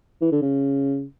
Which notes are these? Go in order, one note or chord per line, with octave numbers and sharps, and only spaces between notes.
E3
D3
C#3